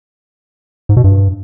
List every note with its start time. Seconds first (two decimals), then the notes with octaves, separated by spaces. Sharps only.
0.89 G#2
0.97 B2
1.04 G2